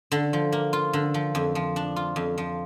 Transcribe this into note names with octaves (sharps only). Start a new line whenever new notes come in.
D3
F3
A#3
F4
D3
F3
F2
F3
D4
F4
F2
F3